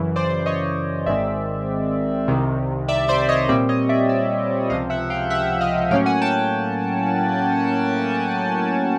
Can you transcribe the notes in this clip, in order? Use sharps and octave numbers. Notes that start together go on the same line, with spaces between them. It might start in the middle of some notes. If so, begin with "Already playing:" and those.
Already playing: F#2 C#3 E3
C5 D5
C#5 D#5
G#1 G#2 D#3 G#3 C4 D5 E5
C2 C3 D#3
D5 E5
C5 D5
C#5 D#5
A#2 G3 C4 D5 E5
C#5 D#5
D5 E5
D5 E5
C#2 C3 F3 D#5 F5
E5 F#5
F5 G5
E5 F#5
D#5 F5
A2 F#3 A#3 C#4 F5 G5
F#5 G#5
G5 A5